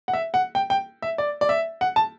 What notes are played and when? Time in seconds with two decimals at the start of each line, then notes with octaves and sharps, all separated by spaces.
0.08 F#5
0.13 E5
0.34 F#5
0.55 G5
0.70 G5
1.02 E5
1.18 D5
1.41 D5
1.49 E5
1.81 F#5
1.96 A5